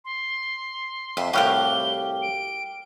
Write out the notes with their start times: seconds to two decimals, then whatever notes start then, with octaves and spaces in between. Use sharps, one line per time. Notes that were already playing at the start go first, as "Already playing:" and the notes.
0.05 C6
1.17 F2 E5
1.33 C2 A2 F#4 G4 F5 F#6 G7
2.22 D7